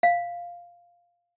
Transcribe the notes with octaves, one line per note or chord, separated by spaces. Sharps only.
F5